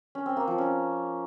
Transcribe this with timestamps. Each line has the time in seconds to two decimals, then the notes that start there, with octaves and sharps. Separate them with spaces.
0.15 C#4
0.26 C4
0.37 A#3
0.47 F3
0.58 C#4